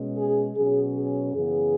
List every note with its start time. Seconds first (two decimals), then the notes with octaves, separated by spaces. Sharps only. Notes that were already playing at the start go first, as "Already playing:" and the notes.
Already playing: B2 G#3 C#4
0.18 G#4
0.56 B2 F#3 C#4 G#4
0.95 G#4
1.34 F#2 C#3 E3 B3 G#4